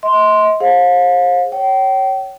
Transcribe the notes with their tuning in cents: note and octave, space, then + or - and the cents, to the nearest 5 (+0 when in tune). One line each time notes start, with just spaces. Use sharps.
D#5 +40 C6 +0
G#4 +0 C5 +35 F5 +35
C#5 +0 G5 -35